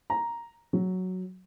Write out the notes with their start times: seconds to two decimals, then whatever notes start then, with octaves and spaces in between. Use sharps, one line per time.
0.10 A#5
0.73 F#3